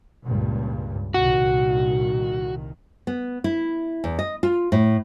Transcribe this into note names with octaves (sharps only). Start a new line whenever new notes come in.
C#2 G2 A#2
C2 A#2 D#3 F#4
B3
E4
E2
D#5
F4
A2